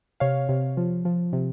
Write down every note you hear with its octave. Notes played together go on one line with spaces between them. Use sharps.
C3 C#5 F5
C3
F3
F3
C3